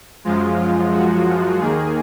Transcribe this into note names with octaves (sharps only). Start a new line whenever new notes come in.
F#2 F3 G#3 F4
F4
F#4
D#2 D#3 A#3 G#4